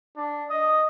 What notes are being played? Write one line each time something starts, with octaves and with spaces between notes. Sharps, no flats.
D4
D#5